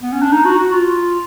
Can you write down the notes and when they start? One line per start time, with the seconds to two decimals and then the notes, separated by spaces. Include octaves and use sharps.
0.02 B3
0.12 C#4
0.22 D4
0.32 D#4
0.45 F#4
0.58 F#4
0.72 F4